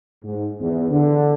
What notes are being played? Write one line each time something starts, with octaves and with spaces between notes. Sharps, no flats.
G#2
E2
D3